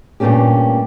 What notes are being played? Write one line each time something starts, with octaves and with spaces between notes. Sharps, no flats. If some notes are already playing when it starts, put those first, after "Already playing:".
G2 A#2 A3 A#3 C#4 G4